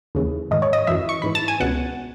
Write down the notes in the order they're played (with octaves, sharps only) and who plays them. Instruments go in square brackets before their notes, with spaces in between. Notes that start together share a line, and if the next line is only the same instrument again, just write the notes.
[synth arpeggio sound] D#2 C#3 E3
G#2 D#3 D#5
C#5
D#5
F#2 E3 E5
C#6
G#2 E3 B5
A5
G#5
C#2 B2 F#5